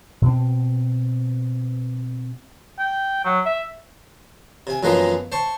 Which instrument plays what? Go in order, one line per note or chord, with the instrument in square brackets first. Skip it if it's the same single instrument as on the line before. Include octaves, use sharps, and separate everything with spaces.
[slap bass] B2 C4
[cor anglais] G5
F#3
E5
[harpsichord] C3 G#5
F#2 E3 F3 G#3 A#3 B3
C5 A5 C#6